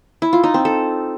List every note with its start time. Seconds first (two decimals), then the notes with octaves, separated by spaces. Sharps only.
0.22 E4
0.33 F4
0.43 D#4
0.54 C4
0.65 A4